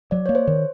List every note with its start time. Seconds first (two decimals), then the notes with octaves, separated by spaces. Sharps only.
0.11 F#3 D5
0.26 A#3 C#5
0.35 C5
0.47 D#3